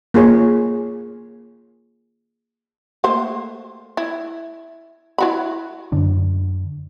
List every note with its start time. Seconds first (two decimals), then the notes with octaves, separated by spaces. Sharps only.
0.14 A#3 F4 G#4 C#5
3.04 A3 A#3 C5
3.97 E4
5.18 E4 F#4 B5
5.92 F#2 D3 D4